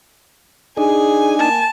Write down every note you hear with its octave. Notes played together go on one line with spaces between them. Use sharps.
D4 D#4 G#4 G#5
A#3 A5